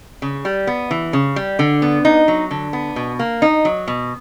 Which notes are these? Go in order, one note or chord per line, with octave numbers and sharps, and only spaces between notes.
C#3
G3
B3
E3
C#3
G3
D3
B3
D#4
F#3
D3
B3
B2
A#3
D#4
F#3
B2